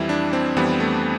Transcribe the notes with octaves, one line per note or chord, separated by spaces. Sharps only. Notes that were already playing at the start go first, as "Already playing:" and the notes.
Already playing: F2 E3 G3 E4
D4
C4
F2 E3 G3 B3
A3